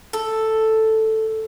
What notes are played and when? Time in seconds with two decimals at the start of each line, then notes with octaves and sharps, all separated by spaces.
0.13 A4